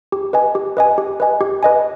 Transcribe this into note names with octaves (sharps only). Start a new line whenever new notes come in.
G4
B4 D#5 G#5
G4
B4 D#5 G#5
G4
B4 D#5 G#5
G4
B4 D#5 G#5